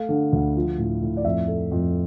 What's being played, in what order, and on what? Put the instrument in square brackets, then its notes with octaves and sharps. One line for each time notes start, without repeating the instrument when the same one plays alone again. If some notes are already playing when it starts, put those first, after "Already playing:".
Already playing: [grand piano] A3 F5
D3
D2
F3
A2
A2
D5
F2 E5
A3
F2